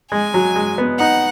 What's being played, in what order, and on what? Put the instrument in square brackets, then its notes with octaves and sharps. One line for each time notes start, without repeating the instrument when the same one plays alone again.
[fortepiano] G#3 [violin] G#5
[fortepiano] F#3
G#3
B3
[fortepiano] D#4 [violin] F#5